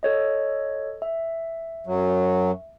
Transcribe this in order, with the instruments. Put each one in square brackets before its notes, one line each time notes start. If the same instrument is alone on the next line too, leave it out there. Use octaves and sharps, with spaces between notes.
[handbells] A4 C#5 D#5
E5
[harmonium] F#2 F#3